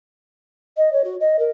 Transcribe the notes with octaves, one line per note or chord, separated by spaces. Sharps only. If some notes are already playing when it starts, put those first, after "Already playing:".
D#5
C#5
F#4
D#5
A#4